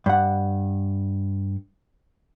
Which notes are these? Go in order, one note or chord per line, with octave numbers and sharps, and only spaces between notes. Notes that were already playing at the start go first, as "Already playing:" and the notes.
G2 F#5